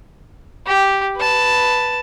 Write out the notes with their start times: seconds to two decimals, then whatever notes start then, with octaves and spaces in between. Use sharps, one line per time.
0.67 G4
1.17 B4 A5